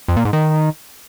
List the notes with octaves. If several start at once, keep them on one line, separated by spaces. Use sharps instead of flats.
F2
A#2
G#2
D#3